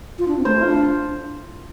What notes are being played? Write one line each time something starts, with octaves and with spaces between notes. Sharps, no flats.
F4
D4
C4
A3 C5
D4 F4